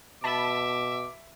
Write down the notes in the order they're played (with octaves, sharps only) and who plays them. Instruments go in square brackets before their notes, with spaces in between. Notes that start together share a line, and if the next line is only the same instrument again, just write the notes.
[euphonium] B2 [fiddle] E5 [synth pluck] A5 B5 [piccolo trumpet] D6